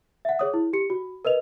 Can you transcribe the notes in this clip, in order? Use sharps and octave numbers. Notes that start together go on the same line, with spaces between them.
E5 F#5
G#4 C#5 D#6
E4
G4 C#7
F#4
A#4 B4 D#5 F7